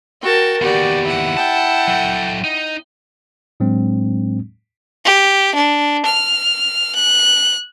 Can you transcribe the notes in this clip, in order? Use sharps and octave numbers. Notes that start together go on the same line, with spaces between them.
F#4 A#4 G5 A5
D#2 B3 F#4 G4 D5
E4 F#5
G5 A5
F#3 A4
D#4
A2 F#3 G#3 C4 D4
G4
D4
F6
F#6